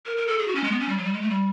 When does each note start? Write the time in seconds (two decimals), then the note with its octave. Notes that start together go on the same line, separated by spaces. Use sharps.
0.06 A#4
0.17 A#4
0.27 A4
0.39 G#4
0.48 F#4
0.55 C#4
0.64 G#3
0.72 B3
0.80 C#4
0.89 G3
0.98 F#3
1.05 G3
1.13 G#3
1.22 A3
1.30 G3